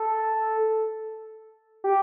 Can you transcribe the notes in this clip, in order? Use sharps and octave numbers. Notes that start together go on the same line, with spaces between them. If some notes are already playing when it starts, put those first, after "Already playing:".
Already playing: A4
G4